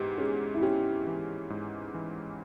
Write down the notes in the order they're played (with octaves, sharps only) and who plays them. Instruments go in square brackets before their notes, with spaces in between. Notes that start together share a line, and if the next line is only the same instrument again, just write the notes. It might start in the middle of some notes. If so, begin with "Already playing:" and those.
Already playing: [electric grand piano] G#2 E3 [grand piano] G4
[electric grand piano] C#4 [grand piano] G#4
[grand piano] E4
[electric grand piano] C#4 [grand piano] G4
[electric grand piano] E3
G#2
E3